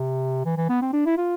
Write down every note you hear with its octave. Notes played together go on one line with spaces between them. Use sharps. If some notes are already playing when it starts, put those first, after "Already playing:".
Already playing: C3
E3
E3
B3
C4
D4
E4
F4